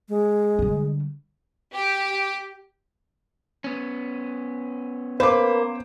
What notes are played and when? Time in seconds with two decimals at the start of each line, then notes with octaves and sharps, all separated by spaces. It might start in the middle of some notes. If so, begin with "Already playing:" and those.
0.09 G#3
0.59 D3 G3
1.74 G4
3.64 B3 C#4
5.20 A#3 B4 C5 D6